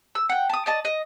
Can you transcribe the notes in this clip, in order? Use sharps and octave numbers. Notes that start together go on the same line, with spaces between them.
E6
F#5 G5
A5 D#6
D5 D#5 A5
D#5